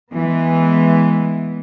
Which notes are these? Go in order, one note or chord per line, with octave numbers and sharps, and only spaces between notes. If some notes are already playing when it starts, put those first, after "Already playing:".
E3 G#3 B3